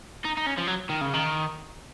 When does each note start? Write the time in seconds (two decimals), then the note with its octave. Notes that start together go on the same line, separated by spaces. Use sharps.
0.25 D#4
0.37 D#4
0.47 C#4
0.58 F3
0.67 F#3
0.89 D#3
1.01 C#3
1.13 D#3